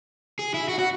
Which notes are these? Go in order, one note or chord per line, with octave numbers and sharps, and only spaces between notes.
G#4
E4
F#4
F#4